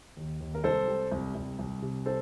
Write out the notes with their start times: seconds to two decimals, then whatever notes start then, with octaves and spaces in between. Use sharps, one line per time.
0.17 D#2
0.40 D#2
0.55 A#4
0.64 C2 A4 C5
0.88 G3
1.12 C2
1.35 C2
1.59 C2
1.82 C3
2.06 A4 C5